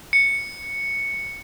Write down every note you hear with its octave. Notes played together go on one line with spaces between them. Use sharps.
C#7